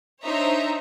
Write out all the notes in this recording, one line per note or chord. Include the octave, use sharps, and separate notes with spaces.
D4 D#4 C5 C#5 E5 A#5